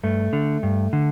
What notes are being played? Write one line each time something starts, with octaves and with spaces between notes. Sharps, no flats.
G2 A3
D3
G2
D3